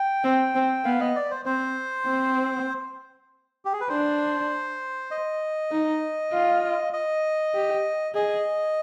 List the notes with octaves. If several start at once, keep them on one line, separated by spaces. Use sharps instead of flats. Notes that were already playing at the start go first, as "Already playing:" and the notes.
Already playing: G5
C4
C4
B3 F5
D#5
D5
C5
C4 C5
C4
G4
G#4
B4
D4 C5
D#5
D#4
F4
D#5
G4
G#4 D#5